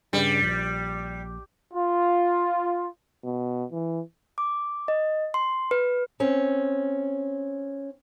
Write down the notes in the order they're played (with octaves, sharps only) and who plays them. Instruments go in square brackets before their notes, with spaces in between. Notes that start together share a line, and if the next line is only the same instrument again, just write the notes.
[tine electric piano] G2 C#3 [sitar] G3
[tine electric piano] A#1
[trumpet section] F4
[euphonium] B2
E3
[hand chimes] D6
D#5
C6
B4
[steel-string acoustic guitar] C4 C#4